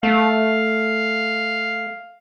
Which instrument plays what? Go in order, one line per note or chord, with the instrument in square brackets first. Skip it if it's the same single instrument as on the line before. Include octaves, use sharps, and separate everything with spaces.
[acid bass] A3 [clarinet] F5